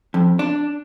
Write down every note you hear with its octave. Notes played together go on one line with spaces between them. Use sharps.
F2
D4